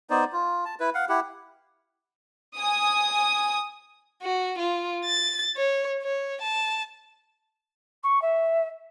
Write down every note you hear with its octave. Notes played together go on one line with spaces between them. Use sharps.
B3 D#4 C5 D5
F4
A5
E4 B4
F5 F#5
E4 G4 F#5
G#5 D#6
F#4
F4
A6
C#5
C#5
A5
C#6
E5